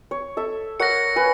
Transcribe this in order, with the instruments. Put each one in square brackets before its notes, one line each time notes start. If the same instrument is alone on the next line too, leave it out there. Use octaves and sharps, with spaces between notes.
[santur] C#5
A4 E5
[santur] A#4 C#5 F#5 [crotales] A#6 C#7
[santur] B4 C#5 G#5